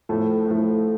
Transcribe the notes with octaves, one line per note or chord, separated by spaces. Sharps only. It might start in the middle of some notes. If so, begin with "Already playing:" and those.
A2 F3 A3
A2 F3 A3